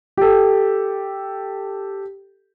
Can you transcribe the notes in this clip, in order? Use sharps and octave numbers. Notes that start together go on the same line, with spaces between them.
G4 A4